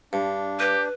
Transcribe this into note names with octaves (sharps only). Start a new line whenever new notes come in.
G2 D4
G4 B4